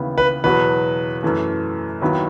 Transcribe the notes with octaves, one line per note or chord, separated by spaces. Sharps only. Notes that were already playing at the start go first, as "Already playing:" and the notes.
Already playing: D#2 C#3 E3 B3 E4
B4
E2 B2 F#3 B3 F#4 B4
F#2 E3 A3
D#2 D#3 F#3 B3 E4